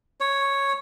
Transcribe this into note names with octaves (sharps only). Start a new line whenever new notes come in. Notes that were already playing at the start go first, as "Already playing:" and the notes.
C#5